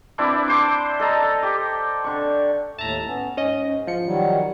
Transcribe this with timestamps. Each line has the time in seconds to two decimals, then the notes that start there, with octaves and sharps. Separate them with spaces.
0.18 C4 D4 E4 B4
0.48 C5 C6 D6
0.99 A4 D#5 A5 A#5
1.43 G4
2.04 D3 C#6
2.79 D#2 A2 E5 A5 A#5
3.07 B3 C#4
3.37 G#2 C#4 D#5
3.87 F3 C#7
4.05 D#3 F#3 G3